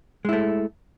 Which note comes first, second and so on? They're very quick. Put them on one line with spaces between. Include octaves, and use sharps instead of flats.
G#3 E4 A3